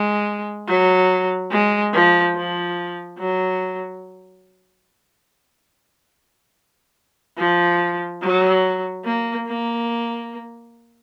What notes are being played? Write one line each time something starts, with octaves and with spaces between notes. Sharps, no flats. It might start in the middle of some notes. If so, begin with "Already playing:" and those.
Already playing: G#3
F#3
G#3
F3
F3
F#3
F3
F#3
A#3
A#3